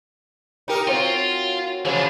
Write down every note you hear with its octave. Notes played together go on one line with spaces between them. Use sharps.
D#4 G4 A#4
F#3 C4 F4
F4
C#3 E3 F3 G#3 D4